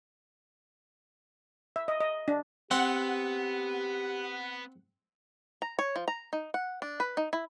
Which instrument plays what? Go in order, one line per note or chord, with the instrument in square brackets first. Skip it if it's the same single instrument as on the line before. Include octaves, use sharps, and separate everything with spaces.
[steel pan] E5
D#5
D#5
D4
[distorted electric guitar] B3 [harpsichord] C4 [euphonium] G4 [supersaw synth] F#5
[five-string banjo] A#5
C#5
F3
A#5
D#4
F#5
D4
B4
D#4
E4